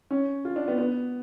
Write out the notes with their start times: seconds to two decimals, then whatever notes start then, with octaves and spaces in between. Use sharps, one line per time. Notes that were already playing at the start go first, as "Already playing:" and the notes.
0.11 C#4
0.45 F4
0.56 D4
0.68 B3
0.78 B3